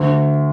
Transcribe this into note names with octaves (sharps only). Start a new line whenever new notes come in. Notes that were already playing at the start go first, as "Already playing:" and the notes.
Already playing: D2